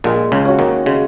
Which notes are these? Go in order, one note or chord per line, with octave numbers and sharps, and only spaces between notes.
A#1 A#2 G#3
C#2 C#3
C#4 F#4
D#2 D#3
C#3 G#3